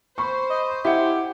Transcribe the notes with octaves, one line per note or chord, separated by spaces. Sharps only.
C5 B5 C#6
D#5
E4 G4 E5 F#5